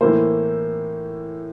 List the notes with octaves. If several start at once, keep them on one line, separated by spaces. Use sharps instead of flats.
A2 E3 A#3 C5